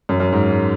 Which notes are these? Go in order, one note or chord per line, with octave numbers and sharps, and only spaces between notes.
F#2
F#2
G#2